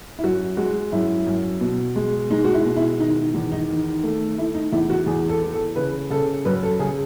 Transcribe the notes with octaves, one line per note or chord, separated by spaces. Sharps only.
E4
F#2 F#4
G#3 F#4
F#2 E4
F#2
B2
G#3
G#3 D#4
F#4
E4
B2
E4
D#3 D#4
E2
D#4
D#3
A3
A3 E4
D#4
E2 E4
F#4
E2 G#4
A4
E3
A4
C#3 B4
C#3 A4
F#2 B4
A4
C#3 G#4